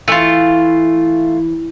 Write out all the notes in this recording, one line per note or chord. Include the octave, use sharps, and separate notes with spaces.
E3 A3 F4